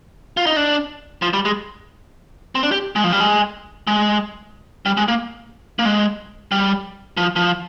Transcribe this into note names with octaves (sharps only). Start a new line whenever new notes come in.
F4
D#4
D4
F3
G3
G#3
C4
D4
G4
G#3
F3
G3
G#3
G#3
G3
G#3
A#3
A#3
G#3
G3
F3
F3